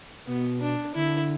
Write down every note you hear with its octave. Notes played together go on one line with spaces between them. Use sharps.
B2 B3
D4
D3 E4